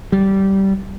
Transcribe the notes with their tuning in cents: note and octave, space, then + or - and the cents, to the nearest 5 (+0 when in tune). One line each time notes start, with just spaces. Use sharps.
G3 -15